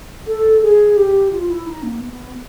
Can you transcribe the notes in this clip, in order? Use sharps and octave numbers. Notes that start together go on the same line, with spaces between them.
A4
G#4
G4
F4
E4
D#4
A#3
B3